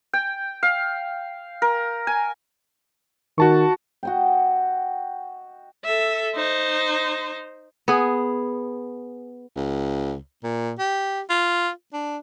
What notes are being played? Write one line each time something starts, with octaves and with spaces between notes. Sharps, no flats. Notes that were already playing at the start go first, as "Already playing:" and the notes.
G5
F5
A#4
G#5
D#3 F#4 A5 C#6
F#4 D#5 G5
A4 E5
D#4 C5
B3 G#4
C#2
A#2
G4
F4
D4